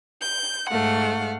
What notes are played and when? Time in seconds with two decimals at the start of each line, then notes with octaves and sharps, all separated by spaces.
0.22 G6
0.70 G#2 A3 F5 F#5